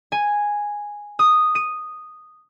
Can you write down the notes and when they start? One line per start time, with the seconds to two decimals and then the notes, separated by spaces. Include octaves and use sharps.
0.12 G#5
1.19 D#6
1.55 D#7